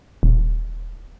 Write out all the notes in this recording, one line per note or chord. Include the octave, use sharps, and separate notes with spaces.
D#1